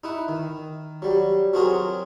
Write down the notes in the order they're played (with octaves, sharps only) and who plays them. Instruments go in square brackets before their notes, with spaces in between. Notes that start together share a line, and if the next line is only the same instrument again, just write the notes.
[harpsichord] D#4 E4 F#5
D#3
F#3 G3
F#3 C4 F4 F#4 G#4 A#4